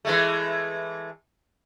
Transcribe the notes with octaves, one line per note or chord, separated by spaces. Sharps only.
E3 G#3 A3